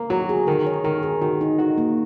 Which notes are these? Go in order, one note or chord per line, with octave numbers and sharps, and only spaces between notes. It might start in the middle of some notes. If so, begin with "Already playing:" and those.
Already playing: A#3
F#3 F#4
G#4
D#3 A#4
C#5
D#3 A#4
G#4
D#3 F#4
D#4
D#4 F#4
A#3